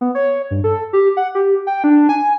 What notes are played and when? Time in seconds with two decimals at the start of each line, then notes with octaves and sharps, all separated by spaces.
0.01 B3
0.15 C#5
0.51 G2
0.64 A4
0.93 G4
1.17 F#5
1.35 G4
1.67 G5
1.84 D4
2.09 G#5